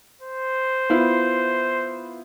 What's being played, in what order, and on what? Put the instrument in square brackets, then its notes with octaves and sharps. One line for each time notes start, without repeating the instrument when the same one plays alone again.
[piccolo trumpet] C5
[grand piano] B3 E4 F4